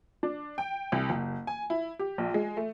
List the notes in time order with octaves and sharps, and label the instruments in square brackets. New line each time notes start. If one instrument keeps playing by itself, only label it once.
[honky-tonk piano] D4
G5
C2
F#1
G#5
E4
G4
A#1
G#3
A3